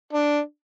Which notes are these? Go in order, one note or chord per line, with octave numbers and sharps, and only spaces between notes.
D4